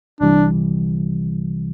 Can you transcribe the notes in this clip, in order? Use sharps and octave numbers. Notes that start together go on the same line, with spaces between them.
C2 C3 E3 G3 D4